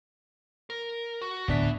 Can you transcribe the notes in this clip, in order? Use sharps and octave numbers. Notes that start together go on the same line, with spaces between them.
A#4
F#4
D1 B3 D4 B4 E5 B6